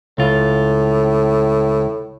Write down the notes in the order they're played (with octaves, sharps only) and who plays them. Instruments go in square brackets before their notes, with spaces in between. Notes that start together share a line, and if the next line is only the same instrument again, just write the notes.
[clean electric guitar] C#2 F4 [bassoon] A2